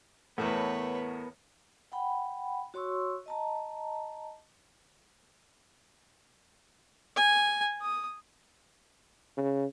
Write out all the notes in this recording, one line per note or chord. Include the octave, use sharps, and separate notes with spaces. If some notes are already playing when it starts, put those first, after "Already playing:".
E2 A2 A3 B3 A#4 B4 C#5 A5
F#5 G5 B5
F#4 C#5 C6 C#6 E6
D#5 A5 A#5
G#5
D#6
C#3